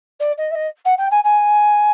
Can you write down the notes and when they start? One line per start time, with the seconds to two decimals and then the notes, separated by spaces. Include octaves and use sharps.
0.20 D5
0.37 D#5
0.51 E5
0.55 D#5
0.85 F#5
0.98 G5
1.11 G#5
1.24 G#5